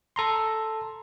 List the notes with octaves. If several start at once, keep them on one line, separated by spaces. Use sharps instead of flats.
A4 A#5 C6